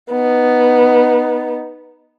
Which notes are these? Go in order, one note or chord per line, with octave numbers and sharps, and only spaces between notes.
B3 D#4